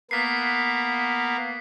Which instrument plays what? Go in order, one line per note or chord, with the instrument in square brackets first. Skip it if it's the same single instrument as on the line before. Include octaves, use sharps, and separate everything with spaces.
[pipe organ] A#3 B3 [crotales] B6 C7